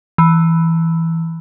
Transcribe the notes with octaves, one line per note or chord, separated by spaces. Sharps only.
E3